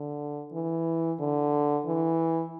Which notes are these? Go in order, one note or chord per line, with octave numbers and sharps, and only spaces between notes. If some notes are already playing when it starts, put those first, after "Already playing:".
Already playing: D3
E3
D3
E3